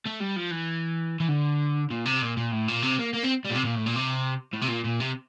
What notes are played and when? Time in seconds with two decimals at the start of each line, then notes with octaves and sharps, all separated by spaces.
0.06 A3
0.20 G3
0.36 F3
0.51 E3
1.20 E3
1.28 D3
1.90 A#2
2.05 C3
2.22 A#2
2.37 A#2
2.52 A2
2.68 A#2
2.83 C3
2.99 A#3
3.14 A#3
3.24 C4
3.45 G3
3.51 A#2
3.55 C3
3.65 A#2
3.76 A2
3.86 A#2
3.96 C3
4.54 A2
4.62 C3
4.68 A#2
4.85 A#2
5.00 C3